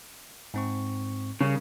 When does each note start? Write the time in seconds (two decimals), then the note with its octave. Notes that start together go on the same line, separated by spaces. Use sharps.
0.54 G#2 C4 C#6
1.41 C#3 G3 A#4